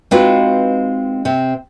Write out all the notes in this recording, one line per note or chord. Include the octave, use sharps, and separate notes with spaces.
G#3 C4 D#4 F4 F#4 B4
C3 C4